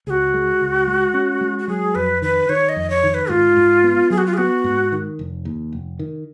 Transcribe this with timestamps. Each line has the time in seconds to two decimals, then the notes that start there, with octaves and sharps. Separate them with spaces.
0.07 C#2 G#4
0.10 F#4
0.34 G#3
0.61 C#2
0.87 G#3
1.14 C#4
1.41 G#3
1.59 F#4
1.68 F#3 G#4
1.95 F2 B4
2.22 D#3 B4
2.49 D#3 C#5
2.69 D#5
2.76 F2
2.90 C#5
3.03 D#3
3.10 C#5
3.14 B4
3.29 G#2 F4
3.57 G#2
3.84 B3
4.10 F#3 G#4
4.18 F#4
4.26 F4
4.33 G#4
4.37 B3 F#4
4.64 G#2
4.92 D#3
5.19 F1
5.45 D#2
5.73 F1
5.99 D#3